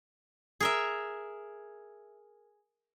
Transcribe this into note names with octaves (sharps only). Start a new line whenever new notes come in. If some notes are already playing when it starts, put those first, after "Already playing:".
G#4 A#4 E5